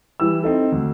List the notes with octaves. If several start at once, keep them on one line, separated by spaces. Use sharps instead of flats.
E3 G3 G4 E6
C4 D#4 A4
D2